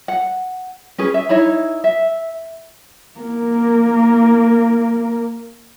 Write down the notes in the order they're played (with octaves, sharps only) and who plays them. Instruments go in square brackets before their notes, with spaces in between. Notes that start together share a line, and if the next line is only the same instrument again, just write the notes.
[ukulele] F#5
C#4 G#4 B4
E5
D#4 E4 C#5 B5
E5
[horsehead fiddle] A#3 A#4